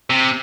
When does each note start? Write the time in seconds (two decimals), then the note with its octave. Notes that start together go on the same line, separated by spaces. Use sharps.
0.10 C3